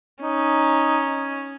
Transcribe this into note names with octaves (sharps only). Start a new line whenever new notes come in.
C#4 D#4